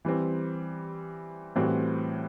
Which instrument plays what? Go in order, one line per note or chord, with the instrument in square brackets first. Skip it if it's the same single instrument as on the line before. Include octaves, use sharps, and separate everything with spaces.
[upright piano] E3 G3 C4
A2 E3 G3 C4 F#4